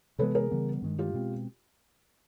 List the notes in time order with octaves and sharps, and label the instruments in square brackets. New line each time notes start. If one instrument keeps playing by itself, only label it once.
[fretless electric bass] C3 E3 G#3 B3 [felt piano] A4 B4
[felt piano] G#4 A#4
[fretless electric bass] C#3 E3 G3 B3
G2 D#3 G#3
[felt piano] F4 G4
[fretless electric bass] B2 G#3 C4